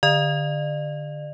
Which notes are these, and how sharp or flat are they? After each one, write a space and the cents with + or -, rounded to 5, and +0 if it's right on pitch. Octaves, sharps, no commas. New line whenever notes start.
D3 +5 D5 +40